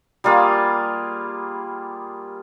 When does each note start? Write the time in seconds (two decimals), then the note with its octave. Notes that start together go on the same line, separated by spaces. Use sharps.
0.24 G3 A#3 F4 G#4